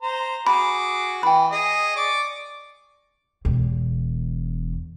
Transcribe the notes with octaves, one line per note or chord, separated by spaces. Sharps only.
C5 A#5
F#4 G#4 B5 D6
E3 G5 B5
G#4 D#5
D5 C#6 D6
E1 E2